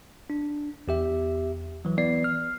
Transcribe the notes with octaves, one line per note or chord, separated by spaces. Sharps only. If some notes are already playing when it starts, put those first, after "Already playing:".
D4
E2 G4 E5
E3 F#3
E3 B3 D5 C7
F6